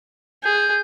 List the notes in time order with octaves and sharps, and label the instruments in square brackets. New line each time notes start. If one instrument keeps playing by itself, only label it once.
[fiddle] G#4 [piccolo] G6